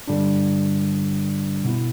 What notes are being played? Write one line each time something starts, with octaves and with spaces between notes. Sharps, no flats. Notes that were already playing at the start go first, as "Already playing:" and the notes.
G2 D3 G3 D4
B2 B3 E4